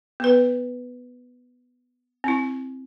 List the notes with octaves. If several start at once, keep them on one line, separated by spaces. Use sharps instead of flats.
B3 B4
C4 E4